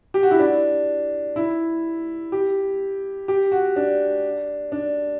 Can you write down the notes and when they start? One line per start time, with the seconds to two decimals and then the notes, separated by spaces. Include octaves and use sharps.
0.14 G4
0.23 F#4
0.31 E4
0.39 D4
1.36 E4
2.32 G4
3.28 G4
3.52 F#4
3.76 D4
4.72 D4